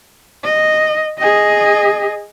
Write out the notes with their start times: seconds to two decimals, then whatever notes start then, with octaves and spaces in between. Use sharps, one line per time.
0.43 D#5
1.18 G#4 D#5